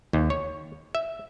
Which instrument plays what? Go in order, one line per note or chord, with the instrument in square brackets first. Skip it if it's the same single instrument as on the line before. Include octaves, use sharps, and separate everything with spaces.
[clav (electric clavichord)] D#2
C#5
E5